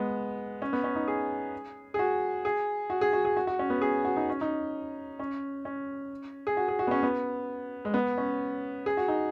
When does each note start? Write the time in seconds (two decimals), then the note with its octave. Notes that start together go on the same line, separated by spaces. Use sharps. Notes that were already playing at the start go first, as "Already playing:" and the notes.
Already playing: G#3 B3
0.62 C#4
0.73 B3
0.84 C#4
0.96 D#4
1.08 G#4
1.94 G#4
1.99 F#4
2.45 G#4
2.90 F#4
3.01 G#4
3.13 F#4
3.25 G#4
3.37 F#4
3.47 F#4
3.59 C#4
3.70 B3
3.81 G#4
4.05 F#4
4.17 D#4
4.29 C#4
4.41 D#4
5.19 C#4
5.65 C#4
6.47 G#4
6.57 F#4
6.68 G#4
6.79 F#4
6.87 B3
6.91 C#4
7.03 B3
7.85 G#3
7.94 B3
8.18 C#4
8.86 G#4
8.97 F#4
9.08 D#4